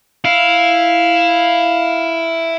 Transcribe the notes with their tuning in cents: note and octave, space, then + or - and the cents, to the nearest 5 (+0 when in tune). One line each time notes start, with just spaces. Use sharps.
E4 +5 F5 +0